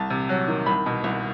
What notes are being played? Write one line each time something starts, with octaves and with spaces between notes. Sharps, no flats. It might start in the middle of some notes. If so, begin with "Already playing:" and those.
Already playing: C2 A5
C3
F#3
D#3
C2 B5
B2
C2